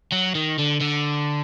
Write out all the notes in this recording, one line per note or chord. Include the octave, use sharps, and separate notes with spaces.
F#3
D#3
D3
D3